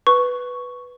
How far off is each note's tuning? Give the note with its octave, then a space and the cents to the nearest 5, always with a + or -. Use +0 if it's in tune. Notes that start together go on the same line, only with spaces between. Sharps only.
B4 +0 C#6 +0